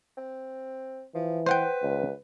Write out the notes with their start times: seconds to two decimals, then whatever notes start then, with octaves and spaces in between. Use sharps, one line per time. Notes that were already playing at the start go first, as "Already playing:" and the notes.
0.17 C4
1.15 E3 F3
1.46 B4 C5 F#5 G5
1.83 C#2